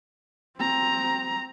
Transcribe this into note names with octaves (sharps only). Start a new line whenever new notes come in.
C4 A#5